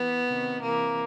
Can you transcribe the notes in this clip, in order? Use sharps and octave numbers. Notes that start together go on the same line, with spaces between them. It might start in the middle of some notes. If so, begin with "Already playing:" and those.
Already playing: E3 B3
C3 D#3
C3 E3 A#3